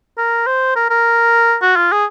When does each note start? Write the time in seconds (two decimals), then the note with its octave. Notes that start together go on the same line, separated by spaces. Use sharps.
0.18 A#4
0.47 C5
0.76 A#4
0.90 A#4
1.62 F#4
1.76 F4
1.92 G#4